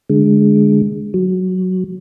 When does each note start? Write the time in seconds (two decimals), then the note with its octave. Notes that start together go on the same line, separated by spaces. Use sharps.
0.10 D3 G#3
1.14 F#3